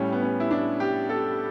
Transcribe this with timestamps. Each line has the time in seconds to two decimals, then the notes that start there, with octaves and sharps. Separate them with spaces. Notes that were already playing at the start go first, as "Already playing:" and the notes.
Already playing: A2 G3 C#4
0.12 B3
0.22 C#4
0.40 E4
0.51 D4
0.80 G4
1.09 A4